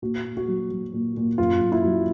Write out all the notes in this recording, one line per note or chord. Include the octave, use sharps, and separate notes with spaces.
A#2 F#4
A#2
F#4
F#3
F#3
A#2
A#2
F#2 F4
F#2
E4
F#3